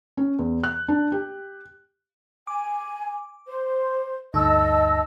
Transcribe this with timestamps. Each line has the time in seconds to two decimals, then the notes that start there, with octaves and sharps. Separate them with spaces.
0.17 C#4
0.39 E2
0.64 F#6
0.88 D4
1.12 G4
2.47 G#5 D6
3.46 C5
4.34 D2 G2 D#4 D#5 A5 E6